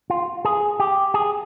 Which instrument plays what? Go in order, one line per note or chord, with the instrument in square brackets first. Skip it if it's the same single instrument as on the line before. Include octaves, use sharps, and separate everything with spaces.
[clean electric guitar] F4
G#4
G4
G#4